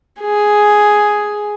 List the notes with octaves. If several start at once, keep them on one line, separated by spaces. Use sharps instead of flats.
G#4